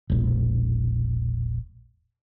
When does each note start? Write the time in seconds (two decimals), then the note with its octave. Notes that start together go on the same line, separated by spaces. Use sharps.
0.10 E1 A#1